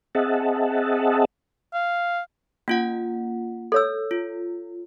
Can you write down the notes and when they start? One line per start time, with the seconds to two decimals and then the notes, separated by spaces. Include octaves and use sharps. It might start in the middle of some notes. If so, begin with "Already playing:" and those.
0.15 C4 G#4 D#5 E5 F#5 A5
1.74 F5
2.68 A#3 C#4 F4 F#5
3.72 A4 C#5 E6
4.11 F4